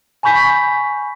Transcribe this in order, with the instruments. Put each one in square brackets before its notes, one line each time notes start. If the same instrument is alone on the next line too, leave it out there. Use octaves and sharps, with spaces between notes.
[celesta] G#5 B5 C#6 G6 B6